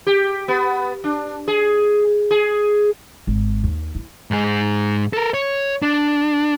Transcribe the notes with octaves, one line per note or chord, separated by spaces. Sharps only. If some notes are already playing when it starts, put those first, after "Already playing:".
G4
B3
D4
G#4
G#4
G#1
D#2
E4
G#2 G#4
A4 A#4
C#5
D4